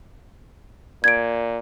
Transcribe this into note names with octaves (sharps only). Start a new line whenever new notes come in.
A#2 G#6 D7